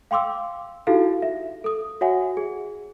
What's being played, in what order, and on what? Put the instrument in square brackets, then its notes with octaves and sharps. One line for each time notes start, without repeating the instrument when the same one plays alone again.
[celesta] F5 G5 C6 D6 E6
D#4 E4 F#4 G4 A4 F5
E5
A4 D#6
F#4 C#5 E5 F#5 G#5
G#4